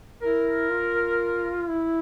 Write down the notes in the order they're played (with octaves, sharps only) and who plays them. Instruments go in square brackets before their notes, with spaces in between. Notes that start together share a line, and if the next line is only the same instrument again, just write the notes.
[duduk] E4 [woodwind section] A#4
[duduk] F4
E4